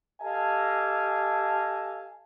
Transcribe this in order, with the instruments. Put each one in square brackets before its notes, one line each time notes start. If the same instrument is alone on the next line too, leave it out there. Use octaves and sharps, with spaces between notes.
[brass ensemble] G4 A4 D#5 F5 G#5 A5